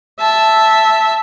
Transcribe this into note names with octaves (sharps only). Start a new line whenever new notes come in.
E5 A5